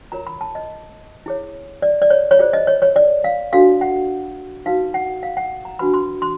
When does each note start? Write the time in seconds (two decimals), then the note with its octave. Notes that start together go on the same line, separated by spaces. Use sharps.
0.12 F4 A#4 C#5 A#5
0.27 B5
0.41 A5
0.55 D#5
1.26 E4 G#4 C#5
1.82 D5
2.02 D5
2.10 C#5
2.31 C#5
2.39 F4 G#4 C5 D5
2.53 D#5
2.67 C#5
2.82 C#5
2.96 D5
3.24 F5
3.53 D4 F#4 A4 F5
3.81 F#5
4.66 D#4 F#4 B4 F5
4.94 F#5
5.23 F5
5.37 F#5
5.65 A#5
5.79 D4 F#4 B4 B5
5.94 C6
6.22 C6